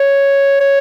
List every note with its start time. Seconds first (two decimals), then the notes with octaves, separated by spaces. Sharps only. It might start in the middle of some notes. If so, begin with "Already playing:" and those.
Already playing: C#5
0.60 C#5